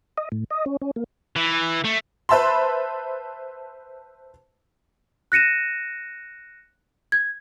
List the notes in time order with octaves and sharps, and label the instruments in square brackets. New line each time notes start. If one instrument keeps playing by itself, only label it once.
[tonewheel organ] D#5
A2
D#5
C#4
C#4
A#3
[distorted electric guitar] E3
A3
[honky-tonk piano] B4 C5 E5 A5 B5 C6
[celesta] F#6 A#6 C#7 D#7 E7
G#6